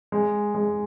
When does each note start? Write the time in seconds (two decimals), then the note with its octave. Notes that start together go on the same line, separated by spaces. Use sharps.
0.12 G#3
0.55 G#3